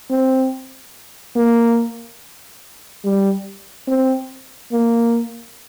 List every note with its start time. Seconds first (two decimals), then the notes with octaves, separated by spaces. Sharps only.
0.10 C4
1.36 A#3
3.04 G3
3.87 C4
4.72 A#3